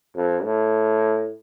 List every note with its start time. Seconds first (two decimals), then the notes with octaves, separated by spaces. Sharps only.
0.16 F2
0.44 A2